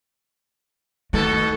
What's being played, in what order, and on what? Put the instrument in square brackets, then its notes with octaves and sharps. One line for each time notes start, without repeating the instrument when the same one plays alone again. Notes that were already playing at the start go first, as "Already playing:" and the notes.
[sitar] B2 D#3 A4 [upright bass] A3